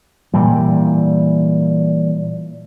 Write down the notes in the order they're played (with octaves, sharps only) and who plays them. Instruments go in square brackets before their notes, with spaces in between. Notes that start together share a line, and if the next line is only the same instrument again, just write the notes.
[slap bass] A#2 E3 G3